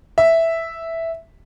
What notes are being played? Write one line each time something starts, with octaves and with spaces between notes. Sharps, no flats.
E5